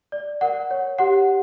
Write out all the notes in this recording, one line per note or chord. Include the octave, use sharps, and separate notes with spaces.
D5
A#4 F#5
C#5
G4 F#5